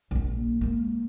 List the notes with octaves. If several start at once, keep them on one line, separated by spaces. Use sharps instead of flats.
A#1 A#3
G#3 A#3